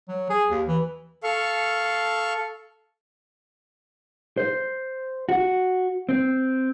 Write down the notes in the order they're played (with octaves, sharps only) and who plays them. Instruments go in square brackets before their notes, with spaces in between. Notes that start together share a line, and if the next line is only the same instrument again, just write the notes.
[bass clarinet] F#3
G#4
D#2
E3
[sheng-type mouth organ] A4 F5 C#6
[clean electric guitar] C5
F#4
C4